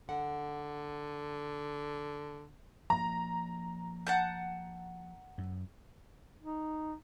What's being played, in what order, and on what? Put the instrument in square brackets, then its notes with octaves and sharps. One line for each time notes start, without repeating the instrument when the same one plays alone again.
[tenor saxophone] D3 [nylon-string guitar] F#5
[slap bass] F3 A#3 [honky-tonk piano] A#5
[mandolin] F#5 A5 G6
[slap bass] F#2
[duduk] D#4